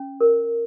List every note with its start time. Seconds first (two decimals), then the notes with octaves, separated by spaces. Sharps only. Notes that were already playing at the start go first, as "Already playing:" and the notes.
Already playing: C#4
0.21 A#4